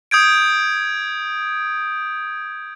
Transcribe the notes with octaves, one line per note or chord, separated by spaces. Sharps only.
D#6 G6 G#6 D7